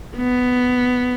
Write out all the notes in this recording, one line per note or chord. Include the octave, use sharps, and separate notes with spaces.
B3